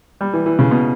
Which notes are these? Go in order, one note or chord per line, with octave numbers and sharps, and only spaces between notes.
G3
E3
E3
C#3
B2